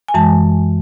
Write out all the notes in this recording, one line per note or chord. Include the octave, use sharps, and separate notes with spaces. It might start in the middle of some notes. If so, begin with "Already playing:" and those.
G#5
F#2 E3 G#3 A5